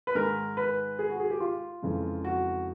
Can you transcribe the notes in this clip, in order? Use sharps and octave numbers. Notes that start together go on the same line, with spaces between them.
B4
G#2 D#3 G#3 A#4
B4
G#4
F#4
G#4
G4
F4
F2 C#3 E3 G#3
F#4